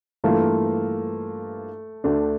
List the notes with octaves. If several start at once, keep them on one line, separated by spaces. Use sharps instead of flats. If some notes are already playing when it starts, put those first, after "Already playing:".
G2 E3 A3 A#3 F4 A#4
D2 D3 A3 D4